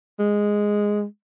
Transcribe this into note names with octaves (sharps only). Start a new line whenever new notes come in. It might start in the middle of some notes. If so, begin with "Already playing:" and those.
G#3